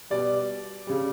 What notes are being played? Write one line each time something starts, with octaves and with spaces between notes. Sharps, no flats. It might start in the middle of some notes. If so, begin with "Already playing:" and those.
B2 G3 D5
C#3 G3